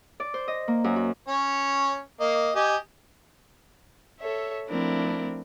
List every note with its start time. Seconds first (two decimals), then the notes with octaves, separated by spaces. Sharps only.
0.20 D5
0.34 C5
0.48 D#5
0.68 A#3
0.84 F#2
0.96 F#4
1.28 C#4 C#5
2.20 A#3 D#5
2.55 G4 D#5 G#5
4.19 A4 C#5 E5
4.69 F3 A3 C4 D4 E4 A#4